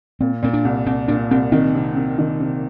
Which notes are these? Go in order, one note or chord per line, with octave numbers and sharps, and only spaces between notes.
A#2 C4
A#2 C4
D4
C2
C2 C4
A#2 D4
C2 C4
D#3 C4
C3
C3
D#3
C3